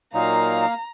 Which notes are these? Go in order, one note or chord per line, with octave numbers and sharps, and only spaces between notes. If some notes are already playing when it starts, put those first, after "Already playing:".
A#2 F#3 A#3 D#4 F5 A#5